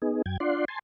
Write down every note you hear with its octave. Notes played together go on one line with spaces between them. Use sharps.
B3 D#4 G#4
F#2 G5 G#6
D4 F4 D5 F#5 C6
G#5 A5 C6